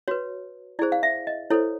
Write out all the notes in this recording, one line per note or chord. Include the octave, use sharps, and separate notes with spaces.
F#4 B4 C#5
E4 G#4 C5 D5
F5
E5
D#5
E4 A4 C5 C#5